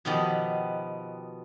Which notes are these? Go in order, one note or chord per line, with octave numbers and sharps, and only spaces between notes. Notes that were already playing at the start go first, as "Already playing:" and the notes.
B2 D#3 F3 B3 G4